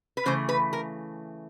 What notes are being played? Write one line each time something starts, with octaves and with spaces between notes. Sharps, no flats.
B4
C#3 E3 A3 C5
B4
A#4